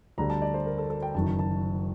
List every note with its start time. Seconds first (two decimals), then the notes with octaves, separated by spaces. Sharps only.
0.18 D2 D3 G3 A#5
0.30 A5
0.42 D5
0.54 C5
0.66 A#4
0.78 A4
0.90 A4
1.02 G5
1.15 F#1 F#2 D#3 A5
1.39 A5